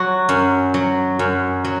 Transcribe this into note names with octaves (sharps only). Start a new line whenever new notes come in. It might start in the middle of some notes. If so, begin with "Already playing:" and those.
Already playing: F#3 F#4
F#2
F#3
F#2
F#3